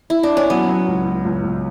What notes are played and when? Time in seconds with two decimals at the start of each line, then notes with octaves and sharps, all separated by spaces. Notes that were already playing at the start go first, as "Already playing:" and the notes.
Already playing: F#4
0.10 E4
0.23 D4
0.37 C#4
0.50 F#3 B3
0.68 F#3
0.88 C#2
1.05 C#2
1.25 C#2
1.44 C#2